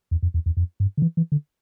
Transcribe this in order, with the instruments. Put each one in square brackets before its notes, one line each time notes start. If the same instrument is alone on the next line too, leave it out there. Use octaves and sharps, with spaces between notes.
[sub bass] E2
F2
E2
E2
F2
G2
D3
E3
E3
D3